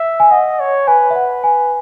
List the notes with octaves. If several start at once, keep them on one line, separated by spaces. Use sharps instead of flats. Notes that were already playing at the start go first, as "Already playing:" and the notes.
Already playing: E5
G#5
D#5 F#5
C#5
B4 G#5
E5
F#5
G#5